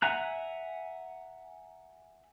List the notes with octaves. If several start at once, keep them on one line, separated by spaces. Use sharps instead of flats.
E5 F#5 G#5 A#5 F#6